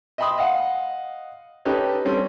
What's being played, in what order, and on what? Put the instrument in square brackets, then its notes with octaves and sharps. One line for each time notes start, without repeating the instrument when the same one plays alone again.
[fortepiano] D#5 E5 G5 B5 C6 D#6
D#5 F5 F#5
C#4 D#4 G4 A4 B4
G3 C4 C#4 A4